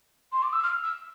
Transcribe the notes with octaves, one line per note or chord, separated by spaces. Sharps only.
C6
D6
E6
F6
E6